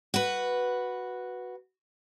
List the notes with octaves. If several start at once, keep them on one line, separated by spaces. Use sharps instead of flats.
F#4 B4